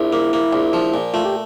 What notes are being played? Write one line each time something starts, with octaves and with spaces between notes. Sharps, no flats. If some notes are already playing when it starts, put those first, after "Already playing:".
Already playing: A#1 E4
A#3
A#3
A#1
F3
A#2
A3 F4
G4